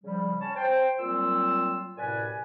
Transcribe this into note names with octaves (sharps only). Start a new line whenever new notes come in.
C#3 F3 G3
C#4 C#5 A5
C5 G5
A#2 F#3 G3 C4 F4 E6
F#2 A2 C3 B4 D5 G#5